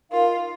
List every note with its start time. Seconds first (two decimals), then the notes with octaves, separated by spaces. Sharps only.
0.11 D#4 F4 A#4 F5